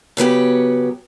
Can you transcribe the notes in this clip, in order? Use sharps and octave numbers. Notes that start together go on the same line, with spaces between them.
C#3 F#3 B3 G4